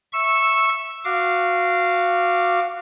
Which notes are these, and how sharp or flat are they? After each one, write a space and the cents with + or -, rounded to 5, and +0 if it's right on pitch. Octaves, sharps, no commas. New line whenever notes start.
E5 -10 C#6 -15 E6 +0
F#4 -15 F5 -15 D6 +0